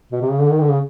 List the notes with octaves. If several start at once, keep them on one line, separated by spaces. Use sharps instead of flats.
B2
C3
C#3
D3
D#3
D3
C#3